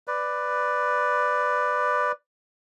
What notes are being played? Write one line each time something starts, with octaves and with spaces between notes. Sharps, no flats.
B4 D5